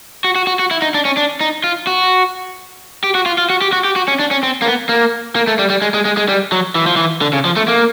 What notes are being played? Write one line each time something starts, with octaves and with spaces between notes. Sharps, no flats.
F#4
F#4
F#4
F#4
E4
D#4
D4
C#4
D4
D#4
F4
F#4
G4
F#4
F4
F4
F#4
G4
F#4
G4
F#4
C#4
D4
C#4
C4
A#3
B3
A#3
A#3
A3
G3
G3
G#3
G#3
G#3
G#3
G3
F#3
E3
F3
E3
D3
C#3
F3
A3
A#3